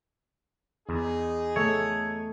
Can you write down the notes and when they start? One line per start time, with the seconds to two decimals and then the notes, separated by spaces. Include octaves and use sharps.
0.89 E2 D#4 G#4
1.56 A3 C#5